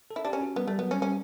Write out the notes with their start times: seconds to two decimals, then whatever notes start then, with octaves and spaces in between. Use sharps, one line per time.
0.11 A4
0.16 E4
0.25 D4 G4
0.33 C#4
0.41 F#4
0.56 G3 B3
0.67 G3 A3
0.79 F#3 B3
0.91 G3 C#4
1.01 G3 C#4